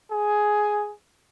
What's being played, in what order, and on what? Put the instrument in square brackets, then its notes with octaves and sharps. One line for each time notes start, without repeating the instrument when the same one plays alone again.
[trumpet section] G#4